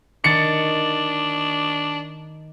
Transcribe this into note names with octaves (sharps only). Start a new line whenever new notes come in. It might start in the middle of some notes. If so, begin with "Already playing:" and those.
D#3 D4 A6 C#7